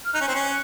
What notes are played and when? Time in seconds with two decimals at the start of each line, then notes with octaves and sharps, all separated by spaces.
0.05 F6
0.14 D#4 F#6
0.21 C#4
0.28 C4
0.35 C#4